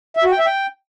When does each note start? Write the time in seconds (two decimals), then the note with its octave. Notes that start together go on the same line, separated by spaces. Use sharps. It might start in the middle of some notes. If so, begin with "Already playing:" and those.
0.17 E5
0.24 F#4
0.31 G5
0.39 E5
0.46 G5